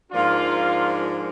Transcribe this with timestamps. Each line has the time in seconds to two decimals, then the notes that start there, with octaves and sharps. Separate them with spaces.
0.11 G#2 F3 A#3 D4 F4